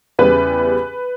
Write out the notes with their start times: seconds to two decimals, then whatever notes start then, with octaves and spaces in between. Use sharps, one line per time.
0.19 E2 C#3 G3 B4